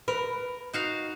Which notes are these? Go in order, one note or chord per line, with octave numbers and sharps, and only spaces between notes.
A#4 B4
D#4 F#4 F5